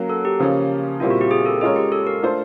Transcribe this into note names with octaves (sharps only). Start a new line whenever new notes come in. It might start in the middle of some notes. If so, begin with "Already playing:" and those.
Already playing: F#3 A#3 C#4 F#4
A4
G4
C#3 F3 A#3 C#4
A#2 G3 C4 E4 F4
F#4
G4
G#4
A4
G#3 C#4 F4 G#4 A#4 C#5
G4
A4
A#4
A3 D4 F4 A4 C5